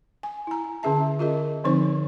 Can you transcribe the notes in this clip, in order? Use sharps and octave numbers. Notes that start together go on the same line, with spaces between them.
G#5
E4 A#5
D3 C#4 G#4 E5 A5
F4 G#4 A#4 D#5
D3 F3 C4 D#4 C5 C#6